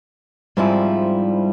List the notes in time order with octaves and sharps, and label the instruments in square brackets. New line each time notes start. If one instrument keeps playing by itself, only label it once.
[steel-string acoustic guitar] G#2 F3 C4 E4 [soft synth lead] G3